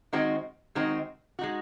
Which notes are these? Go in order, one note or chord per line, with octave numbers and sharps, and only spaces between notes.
D#3 G#3 C4 D#4 F#4
D#3 G#3 C4 D#4 F#4
G#3 D#4 F#4